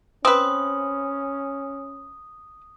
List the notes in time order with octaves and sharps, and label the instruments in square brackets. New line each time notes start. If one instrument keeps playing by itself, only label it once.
[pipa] C4 B4 [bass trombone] C#4 [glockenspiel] D#6